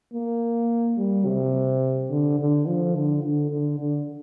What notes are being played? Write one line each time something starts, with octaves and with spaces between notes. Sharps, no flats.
A#3
G3
C3
D3
D3
F3
D3
D3
D3
D3